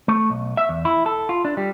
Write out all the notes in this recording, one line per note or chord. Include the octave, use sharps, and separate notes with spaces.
A3
B1
E5
E2
E4
A4
F4
D4
G3